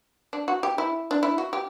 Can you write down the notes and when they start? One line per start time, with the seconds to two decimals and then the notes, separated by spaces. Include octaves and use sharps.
0.33 D4
0.48 F#4
0.63 G4
0.78 E4
1.11 D4
1.23 E4
1.38 F#4
1.53 G4